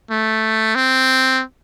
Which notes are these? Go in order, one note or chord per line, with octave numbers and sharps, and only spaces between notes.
A3
C4